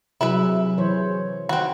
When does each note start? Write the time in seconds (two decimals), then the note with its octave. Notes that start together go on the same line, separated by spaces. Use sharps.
0.21 C3 F#3 E4 G#4 B4 E5
0.78 E3 C5 C#5
1.49 D#3 C4 F#4